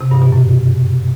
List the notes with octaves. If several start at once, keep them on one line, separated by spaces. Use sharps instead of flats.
C3
G2
B2
F#2